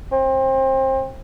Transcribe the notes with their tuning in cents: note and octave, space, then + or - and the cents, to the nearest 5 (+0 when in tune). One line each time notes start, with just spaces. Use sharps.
C4 +25